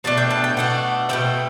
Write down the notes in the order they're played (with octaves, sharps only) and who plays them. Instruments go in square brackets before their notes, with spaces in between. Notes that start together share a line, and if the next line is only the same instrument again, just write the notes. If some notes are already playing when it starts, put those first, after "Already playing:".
[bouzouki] B2 A3 D4 A5
G5
A5
G5
B2 A3 D4 F#5
B2 A3 C4 G5